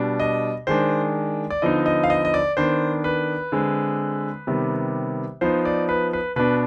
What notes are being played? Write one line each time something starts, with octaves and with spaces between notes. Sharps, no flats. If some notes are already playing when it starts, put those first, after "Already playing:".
Already playing: B2 G3 D4
D#5
D#3 G#3 D4 C5
D5
D3 F3 B3 D#4 D#5
D#5
F5
D#5
D#5
D5
D#3 B3 D4 C5
B4
D3 G#3 C4
C3 D#3 G3 B3
F3 B3 D#4 C5
D5
B4
B4
B2 B3 D4 B4